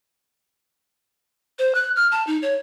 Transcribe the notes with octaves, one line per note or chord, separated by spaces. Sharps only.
C5
F#6
F6
A5
D#4
C#5